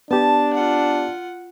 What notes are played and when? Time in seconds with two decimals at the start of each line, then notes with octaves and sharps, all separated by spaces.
0.11 B3 D4 G4 A5
0.54 F4 F#5